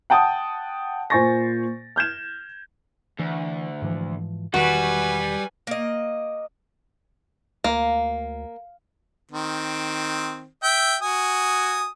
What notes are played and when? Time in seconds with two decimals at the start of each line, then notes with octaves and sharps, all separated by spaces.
0.10 F#5 G5 A5 D#6
1.10 A#2 C5 G#5 C#6 A6 A#6
1.96 F6 G6 G#6 E7
3.19 D2 E3
3.82 G#2 E3 F3
4.54 E1 D#3 G3 F#4 B4 G#5
5.67 A#3 D#5
7.64 D2 A#3 F5
9.31 D#3 C4
10.63 E5 G5
11.02 F#4 G#5 D#6